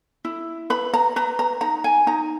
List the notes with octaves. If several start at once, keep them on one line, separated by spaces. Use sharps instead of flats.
E4
B4 B5
A#5
B4 A#5
A#5
D#4 A#5
G#5
D#4 A#5